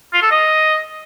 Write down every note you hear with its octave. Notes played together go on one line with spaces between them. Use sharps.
F4
A4
D#5